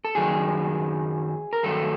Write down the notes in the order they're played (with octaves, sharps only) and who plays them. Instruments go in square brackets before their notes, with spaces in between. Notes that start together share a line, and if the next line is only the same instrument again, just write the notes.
[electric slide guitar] A4
F#2 D#3 F#3 G#4
A#4
G2 D#3 F#3 A3 A4